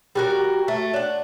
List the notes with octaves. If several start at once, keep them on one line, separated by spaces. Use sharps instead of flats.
G3 F#4 A#4
A3
D4 F#5